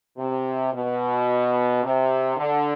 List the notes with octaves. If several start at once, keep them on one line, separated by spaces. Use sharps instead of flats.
C3
B2
C3
D3